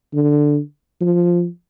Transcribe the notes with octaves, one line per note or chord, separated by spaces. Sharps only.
D3
F3